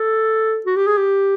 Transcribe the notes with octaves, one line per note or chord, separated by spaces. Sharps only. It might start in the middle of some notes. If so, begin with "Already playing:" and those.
Already playing: A4
F#4
G4
G#4
G4